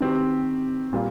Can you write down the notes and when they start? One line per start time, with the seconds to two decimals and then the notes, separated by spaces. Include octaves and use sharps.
0.01 D#3 C4 G4
0.93 A#2 G3 A#3 F4